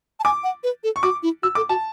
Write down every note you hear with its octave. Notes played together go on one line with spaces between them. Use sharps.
A5
G#5 D6
F#5
B4
A4
C#6
F#4 D6
E4
F#4 E6
A4 D6
F#4 A5